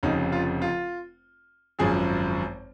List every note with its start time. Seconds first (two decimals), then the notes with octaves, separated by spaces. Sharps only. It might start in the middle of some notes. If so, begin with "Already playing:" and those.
0.03 F1 F2 C#3 D#4
0.32 F4
0.62 F4
1.79 G#1 F#2 F3 G#4